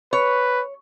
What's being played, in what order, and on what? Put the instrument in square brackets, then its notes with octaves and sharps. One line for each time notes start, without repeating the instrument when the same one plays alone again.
[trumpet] B4 [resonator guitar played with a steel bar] C#5